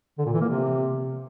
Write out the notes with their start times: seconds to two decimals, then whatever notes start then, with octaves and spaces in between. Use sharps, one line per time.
0.18 D3
0.26 A#2
0.33 E3
0.41 A#3
0.48 C3